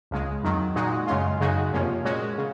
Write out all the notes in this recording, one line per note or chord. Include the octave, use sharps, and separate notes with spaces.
C#2 C#3 G#3
F2 D#3 F#3
A#2 G#3 D#4 F#4
F#2 C#3 G#3 C#4 F4
F#2 C#3 G#3 D#4 F#4
F2 C3 F3 A#3 C#4
A#2 G#3 C#4 F#4
C#3